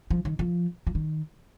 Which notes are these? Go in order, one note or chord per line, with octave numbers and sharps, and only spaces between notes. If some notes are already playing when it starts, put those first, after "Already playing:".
F3
D#3
F3
F3
D#3